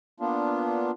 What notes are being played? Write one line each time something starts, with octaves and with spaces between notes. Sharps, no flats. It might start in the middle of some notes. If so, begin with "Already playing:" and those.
A#3 B3 D4 F4